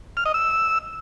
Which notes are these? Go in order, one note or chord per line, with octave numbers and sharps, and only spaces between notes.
F6
D#5
E6